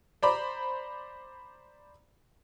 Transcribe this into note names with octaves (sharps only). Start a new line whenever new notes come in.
C5 D5 A#5 B5 D6